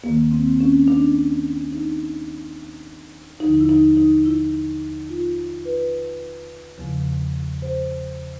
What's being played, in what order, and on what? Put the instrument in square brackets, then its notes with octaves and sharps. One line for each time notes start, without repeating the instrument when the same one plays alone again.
[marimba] D#2 D#3 A#3
C4
C#4
D4
D#4
D#2 D3 F3 D#4
E4
D#4
D#4
E4
F4
B4
E2 C#3 F3
C5